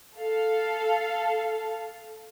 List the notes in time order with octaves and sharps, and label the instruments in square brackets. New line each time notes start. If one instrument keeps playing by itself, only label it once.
[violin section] A4 F5